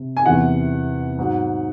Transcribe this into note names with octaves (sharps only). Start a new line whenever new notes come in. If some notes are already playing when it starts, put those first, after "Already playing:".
Already playing: C3
G#5
E2 C3 E3 F#5
G#2 F#3